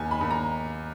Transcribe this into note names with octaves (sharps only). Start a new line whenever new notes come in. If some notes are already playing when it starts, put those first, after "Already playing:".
Already playing: D#2 G#5
B5
D#2
A#5